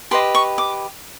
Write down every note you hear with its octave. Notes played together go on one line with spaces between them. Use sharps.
G4 B4 D#5 C6
C#6
D6